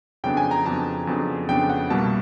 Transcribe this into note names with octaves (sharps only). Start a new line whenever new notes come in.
F2 C#3 F#3 B3 D4 G5
G#5
A#5
F2 C#3 F#3 B3 D4 A5
F2 C#3 F#3 B3 D4
F2 C#3 F#3 B3 D4 G5
F#5
C2 B2 G3 A#3 A5